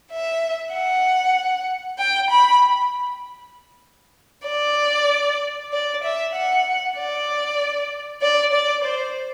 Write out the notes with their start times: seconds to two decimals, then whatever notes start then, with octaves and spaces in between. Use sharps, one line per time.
0.11 E5
0.74 F#5
1.98 G5
2.31 B5
4.48 D5
5.73 D5
6.04 E5
6.36 F#5
6.98 D5
8.22 D5
8.53 D5
8.84 C5